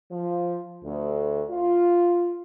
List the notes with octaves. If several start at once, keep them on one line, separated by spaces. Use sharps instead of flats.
F3
D2
F4